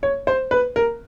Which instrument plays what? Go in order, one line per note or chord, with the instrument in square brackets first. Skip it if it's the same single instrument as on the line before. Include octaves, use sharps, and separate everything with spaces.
[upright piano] C#5
C5
B4
A#4